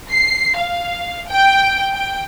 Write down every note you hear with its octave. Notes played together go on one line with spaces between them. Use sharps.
C7
F5
G5
G5